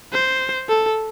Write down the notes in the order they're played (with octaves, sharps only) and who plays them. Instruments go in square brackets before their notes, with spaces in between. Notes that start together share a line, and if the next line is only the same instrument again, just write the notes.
[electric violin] C5
A4